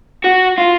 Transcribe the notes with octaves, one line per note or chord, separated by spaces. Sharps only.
F#4
F4